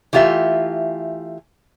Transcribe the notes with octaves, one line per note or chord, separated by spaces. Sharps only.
E3 A3 F4 G4 E5